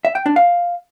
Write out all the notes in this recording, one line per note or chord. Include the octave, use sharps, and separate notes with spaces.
E5
G5
D4
F5